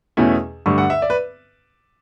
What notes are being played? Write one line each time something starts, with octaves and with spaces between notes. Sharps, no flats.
E2 B2 A3 C#4 E4
G2 D3 A3 C#6
F#5
E5
D5
B4